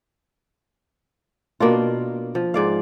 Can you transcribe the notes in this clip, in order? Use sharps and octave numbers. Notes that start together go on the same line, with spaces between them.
B2 A#3 D4 F4
F3
G#2 D5 F5